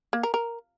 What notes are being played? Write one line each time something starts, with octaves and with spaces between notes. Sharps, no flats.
A#3
A#4
A#4